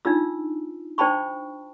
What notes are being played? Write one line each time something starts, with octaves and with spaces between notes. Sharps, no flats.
D4 D#4 F4 E6
D4 C5 G5 A5 B5 C#6